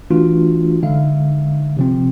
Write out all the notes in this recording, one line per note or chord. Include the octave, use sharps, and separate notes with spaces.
E3 A3 D4 F4 F#4
D3 G#3 D#4 E5 F5
C3 F3 C4